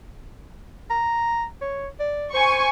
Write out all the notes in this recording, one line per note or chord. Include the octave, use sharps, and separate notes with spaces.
A#5
C#5
D5
C5 G#5 C#6